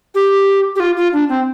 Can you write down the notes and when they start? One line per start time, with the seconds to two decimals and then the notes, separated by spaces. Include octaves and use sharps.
0.15 G4
0.76 G4
0.80 F4
0.97 F4
1.13 D4
1.29 C4